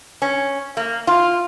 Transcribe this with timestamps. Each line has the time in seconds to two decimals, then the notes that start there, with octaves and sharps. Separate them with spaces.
0.22 C#4
0.77 A#3
1.07 F4